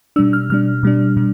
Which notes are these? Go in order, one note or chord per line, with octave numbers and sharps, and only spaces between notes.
B2 G3 D4 E6
F6
B2 G3 D4 F6
B2 G3 D4
B2 G3 D4